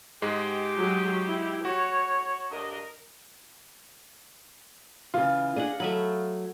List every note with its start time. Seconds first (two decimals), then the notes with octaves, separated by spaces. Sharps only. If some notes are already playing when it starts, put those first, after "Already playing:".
0.22 G#2 G#3 G4
0.77 F#3 G#4
1.27 E4
1.65 F#4 C#5
2.52 G2 D4 A#4 D#5
5.14 C#3 E3 F4
5.56 D4 G#4 D5 D#5 F#5
5.80 F#3 A3 D#5 B5